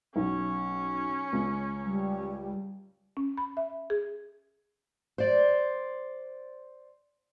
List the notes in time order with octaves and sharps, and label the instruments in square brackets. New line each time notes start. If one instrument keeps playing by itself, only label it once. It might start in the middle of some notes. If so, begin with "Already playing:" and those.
[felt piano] B1 [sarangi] C#4
[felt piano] C#2
[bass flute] G3
[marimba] C#4
B5
E5
G#4
[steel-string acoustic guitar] C5 D5